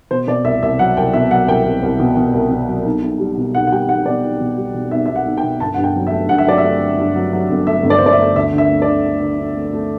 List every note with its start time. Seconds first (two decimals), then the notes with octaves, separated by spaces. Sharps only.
0.11 B2 C5
0.27 B2 D5
0.45 C2 E5
0.63 C2 E5
0.79 F#3 F#5
0.97 C2 G5
1.13 B2 E5
1.31 F#3 F#5
1.48 C2 G5
1.66 C2
1.83 C2
2.00 B2
2.17 B2
2.34 C2
2.51 B2
2.68 F#3
2.85 B1
3.03 B1
3.20 G3
3.37 B2
3.55 B1 F#5
3.67 F#5
3.72 G3 G5
3.88 B1 F#5
4.06 B2 D5
4.24 B1
4.41 B2
4.58 G3
4.74 B2
4.91 B1 E5
5.06 B1 E5
5.16 F#5
5.26 B1
5.37 G5
5.43 B2
5.60 G1 A5
5.74 G2 F#5
5.84 G5
5.96 F#3
6.07 E5
6.12 A3
6.29 G2 F#5
6.38 E5
6.47 F#3 D5
6.58 E5
6.64 A3
6.81 A3
6.99 G2
7.16 F#3
7.33 F#3
7.50 G1
7.66 A3 E5
7.84 G1
7.90 D5
7.98 C5
8.01 G1
8.06 D5
8.13 E5
8.18 A3
8.36 D2 E5
8.52 D3
8.58 E5
8.70 A3
8.82 D5
8.88 D3
9.05 A3
9.22 D3
9.39 D3
9.56 A3
9.73 A3